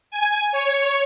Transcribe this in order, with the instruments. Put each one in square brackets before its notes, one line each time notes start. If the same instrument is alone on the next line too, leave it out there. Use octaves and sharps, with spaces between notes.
[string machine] G#5
C#5